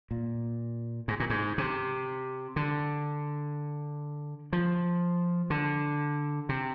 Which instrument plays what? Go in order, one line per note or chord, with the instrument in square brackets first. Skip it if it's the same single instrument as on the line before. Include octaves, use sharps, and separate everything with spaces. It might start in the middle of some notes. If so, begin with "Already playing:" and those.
[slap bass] A#2
G#2
A#2
G#2
C3
D3
F3
D3
C3